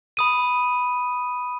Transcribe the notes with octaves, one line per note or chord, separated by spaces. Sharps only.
B5 D#6 D#7